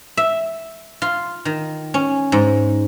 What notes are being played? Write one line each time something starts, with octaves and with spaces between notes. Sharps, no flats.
E5
F4
D#3
C#4
G#2